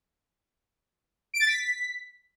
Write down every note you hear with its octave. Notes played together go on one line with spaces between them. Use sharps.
D7
A6
B6